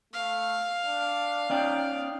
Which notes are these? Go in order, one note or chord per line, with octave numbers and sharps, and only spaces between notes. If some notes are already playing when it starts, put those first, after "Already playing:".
A3 F5
D4
C#4 D#4 D5 G5